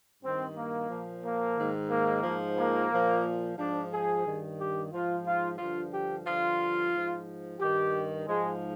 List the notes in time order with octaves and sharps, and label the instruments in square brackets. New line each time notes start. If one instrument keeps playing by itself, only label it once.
[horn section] G2 D#3 C4
A#3
A#2 F3
A#3
G#2 D#3
A#3
G#2 F3
A#3
A#2 F3
G#2 F3 D4
G#4
G2 D#3
G4
G#2 F3 F4
F4
G2 D3 F3 F4
G4
G2 D3 F3 F4
G#2 F3
G2 D#3 G4
G#2 F3 G#3